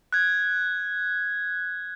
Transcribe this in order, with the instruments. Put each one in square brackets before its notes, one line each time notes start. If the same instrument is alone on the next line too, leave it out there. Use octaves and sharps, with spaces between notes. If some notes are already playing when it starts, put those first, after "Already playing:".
[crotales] F#6 G#6